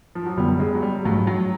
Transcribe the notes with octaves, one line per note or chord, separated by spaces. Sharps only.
F3
F#3
F#2 D3 F#3 G3 B3
G#3
F#3
G3
G#2 F3 F#3 A3
F#3